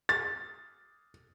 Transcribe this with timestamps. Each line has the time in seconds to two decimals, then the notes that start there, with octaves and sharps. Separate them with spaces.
0.09 A6